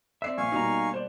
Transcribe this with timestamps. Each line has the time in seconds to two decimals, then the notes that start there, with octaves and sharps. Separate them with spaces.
0.22 C4 D5 E5 B6 C7
0.38 A#1 F5 G#5 C#6
0.52 B2 G3 A#3 D#4 A#5
0.94 C5 D5